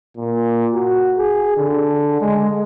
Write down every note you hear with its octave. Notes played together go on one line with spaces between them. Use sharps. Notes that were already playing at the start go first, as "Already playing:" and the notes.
A#2
F#4
G#4
D3
G#3